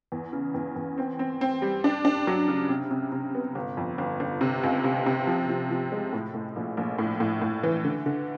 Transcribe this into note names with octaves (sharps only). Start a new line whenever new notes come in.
E2
C#3
E2
E2
C4
C4
C4
G3
D4
D4
F#3
C#3
C3
C3
C3
B3
G1
F2
G1
G1
C3
C#2
C3
C3
F3
F3
F3
G#3
A2
A2
A#1
A#1
A2
A2
A2
E3
D3
D3